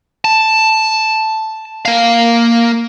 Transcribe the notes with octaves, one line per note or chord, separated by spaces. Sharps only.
A5
A#3 F5